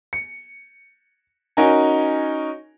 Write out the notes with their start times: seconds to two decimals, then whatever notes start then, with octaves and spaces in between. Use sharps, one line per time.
0.13 C#7
1.57 C#4 D#4 F#4 A#4 G#5